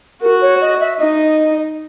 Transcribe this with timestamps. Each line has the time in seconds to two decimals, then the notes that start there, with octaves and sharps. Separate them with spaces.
0.21 F#4 A#4
0.41 C#5
0.61 D#5
0.80 E5
1.00 D#4 D#5